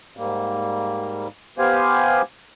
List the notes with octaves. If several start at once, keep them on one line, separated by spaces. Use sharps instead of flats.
G#2 G3 A#3
B3 G4 C5 F5 G#5